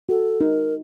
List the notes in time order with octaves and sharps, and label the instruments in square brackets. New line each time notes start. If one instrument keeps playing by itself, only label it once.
[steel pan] F#4 [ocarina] A4
[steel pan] D#4 [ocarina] A#4